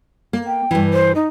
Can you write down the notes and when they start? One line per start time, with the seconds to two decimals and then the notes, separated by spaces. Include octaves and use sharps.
0.33 A#3
0.47 G5
0.71 G2 E3
0.93 C5
1.15 D#4